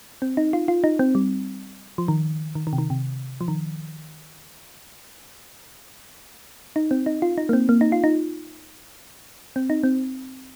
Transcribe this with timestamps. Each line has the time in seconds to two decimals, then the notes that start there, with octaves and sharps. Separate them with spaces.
0.22 C4
0.37 D#4
0.53 F4
0.68 F4
0.84 D#4
0.99 C4
1.15 G3
1.98 F3
2.08 D#3
2.55 D#3
2.67 D#3
2.73 C3
2.78 D#3
2.90 C3
3.41 F3
3.48 D#3
6.76 D#4
6.91 C4
7.06 D#4
7.22 F4
7.38 D#4
7.49 A#3
7.53 C4
7.69 A#3
7.81 D#4
7.92 F4
8.04 D#4
9.56 C4
9.70 D#4
9.83 C4